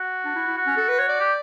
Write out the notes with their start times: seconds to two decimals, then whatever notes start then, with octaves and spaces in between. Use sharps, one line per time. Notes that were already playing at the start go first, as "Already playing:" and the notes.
Already playing: F#4
0.25 D4
0.36 E4
0.47 E4
0.57 F#4
0.66 C#4
0.77 A4
0.89 B4
0.99 C#5
1.09 D5
1.20 G4